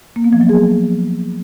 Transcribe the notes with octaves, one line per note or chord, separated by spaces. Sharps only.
A#3
B3
F3
F#3
G#4